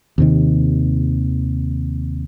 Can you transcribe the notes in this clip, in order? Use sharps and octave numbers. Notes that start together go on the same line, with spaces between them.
D#2 C3 D#3